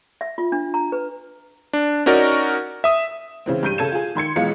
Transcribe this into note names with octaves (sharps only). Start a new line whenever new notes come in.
E5
F4
D4
A#5
B4
D4
C#4 D#4 F#4 A#4 D5
E5 D#6
C#3 E3 C4
G2 G6 D#7
C#3 A4 G#6 E7
F4 G#4
D#3 C6 G#6 C#7
B1 E3 G#3 F4 F5 C#7